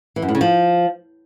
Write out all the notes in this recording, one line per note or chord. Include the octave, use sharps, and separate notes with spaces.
E3
F#2
A2
C#3
F3